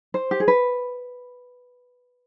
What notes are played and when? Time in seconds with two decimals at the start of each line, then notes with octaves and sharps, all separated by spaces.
0.14 C5
0.31 G4
0.40 G#4
0.48 B4